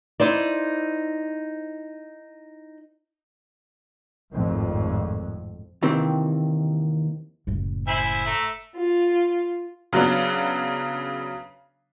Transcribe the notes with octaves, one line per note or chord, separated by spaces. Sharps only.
D#4 E4 C5 D5
G#1 F2 A2
D#2 C3 D#3 E3 C4
F#1 A2
E4 C5 E5 G#5
A3 A#5
F4
C#3 F#3 B3 D4